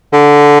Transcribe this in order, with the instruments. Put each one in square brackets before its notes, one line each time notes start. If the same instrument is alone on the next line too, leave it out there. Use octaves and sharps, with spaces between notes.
[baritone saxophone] D3